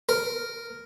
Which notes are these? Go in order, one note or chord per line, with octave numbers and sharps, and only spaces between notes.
A#4